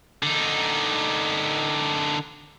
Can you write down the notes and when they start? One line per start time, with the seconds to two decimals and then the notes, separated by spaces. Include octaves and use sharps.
0.23 D3 D#4